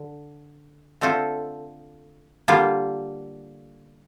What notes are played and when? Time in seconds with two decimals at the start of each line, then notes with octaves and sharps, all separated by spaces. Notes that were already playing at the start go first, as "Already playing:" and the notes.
Already playing: D3
1.01 D3 A3 C4 F4 A4
2.48 D3 G3 A#3 F4